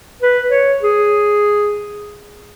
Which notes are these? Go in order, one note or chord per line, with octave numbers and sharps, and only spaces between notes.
B4
C#5
G#4